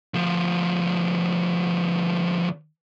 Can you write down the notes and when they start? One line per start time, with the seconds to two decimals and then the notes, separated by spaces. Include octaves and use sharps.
0.14 D2 F3